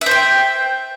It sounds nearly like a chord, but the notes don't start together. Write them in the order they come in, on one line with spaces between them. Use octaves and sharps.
E5 C5 G5